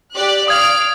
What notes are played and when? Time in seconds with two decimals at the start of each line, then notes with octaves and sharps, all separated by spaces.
0.14 G4 D5 F#6
0.48 F5 D#6 F6 G#6 D7